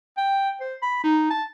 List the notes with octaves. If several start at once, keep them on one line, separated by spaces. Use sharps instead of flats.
G5
C5
B5
D#4
A5